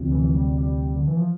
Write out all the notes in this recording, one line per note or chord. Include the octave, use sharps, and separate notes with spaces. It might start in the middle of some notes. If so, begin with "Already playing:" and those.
Already playing: D2 C3 F3
E3
G3
G3
D3
E3
F3